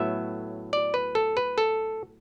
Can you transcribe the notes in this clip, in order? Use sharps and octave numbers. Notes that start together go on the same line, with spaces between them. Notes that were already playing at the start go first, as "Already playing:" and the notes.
Already playing: A2 F#3 B3 E5
D5
B4
A4
B4
A4